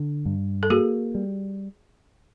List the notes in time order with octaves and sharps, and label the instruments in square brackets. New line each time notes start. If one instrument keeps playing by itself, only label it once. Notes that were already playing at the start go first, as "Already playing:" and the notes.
Already playing: [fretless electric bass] D3
G2
[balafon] A4
[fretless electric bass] A#3 [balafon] F#4 G#4
[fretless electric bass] G3